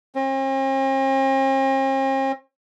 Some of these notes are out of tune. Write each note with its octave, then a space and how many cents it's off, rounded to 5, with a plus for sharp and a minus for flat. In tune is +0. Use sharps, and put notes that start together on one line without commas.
C4 +45